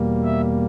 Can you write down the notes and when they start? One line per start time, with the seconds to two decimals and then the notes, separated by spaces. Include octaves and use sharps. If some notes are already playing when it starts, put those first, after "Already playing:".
Already playing: E2 B2 G3 A#3
0.24 E5